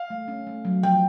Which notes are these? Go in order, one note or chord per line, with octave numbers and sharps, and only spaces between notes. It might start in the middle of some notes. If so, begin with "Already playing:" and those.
Already playing: F5
A3
C#4
A3
F#3
F3 G5